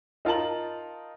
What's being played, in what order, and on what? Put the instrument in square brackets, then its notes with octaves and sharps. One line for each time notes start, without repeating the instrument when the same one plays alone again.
[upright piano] D#4 F4 A#4 A5 F#7